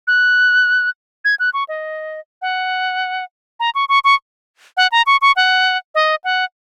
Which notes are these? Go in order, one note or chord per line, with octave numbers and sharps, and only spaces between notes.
F#6
G#6
F#6
C#6
D#5
F#5
A#5
C#6
C#6
C#6
F#5
A#5
C#6
C#6
F#5
D#5
F#5